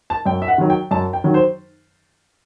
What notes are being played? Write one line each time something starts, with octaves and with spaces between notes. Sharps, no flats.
A5
F#2 G5
E5
F#5
D#3 F#3
G5
F#2 A5
G5
D#3 F#3
C5